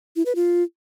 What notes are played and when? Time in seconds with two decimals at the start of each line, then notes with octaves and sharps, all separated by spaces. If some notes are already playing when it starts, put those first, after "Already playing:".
0.16 E4
0.26 B4
0.35 F4